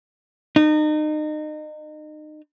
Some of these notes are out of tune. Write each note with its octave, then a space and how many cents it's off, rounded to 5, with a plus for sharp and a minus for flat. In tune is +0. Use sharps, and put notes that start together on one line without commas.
D#4 -30